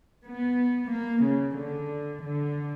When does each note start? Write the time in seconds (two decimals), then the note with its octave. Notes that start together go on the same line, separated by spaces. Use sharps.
0.25 B3
0.92 A#3
1.24 C#3
1.57 D3
2.23 D3